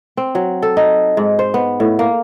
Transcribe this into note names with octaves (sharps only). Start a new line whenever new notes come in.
C4
F#3
A4
D#4
G#2
C5
B3
A2
A#3